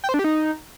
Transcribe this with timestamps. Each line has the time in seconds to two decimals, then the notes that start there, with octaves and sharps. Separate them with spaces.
0.04 G5
0.09 C5
0.14 D4
0.19 G4
0.24 D#4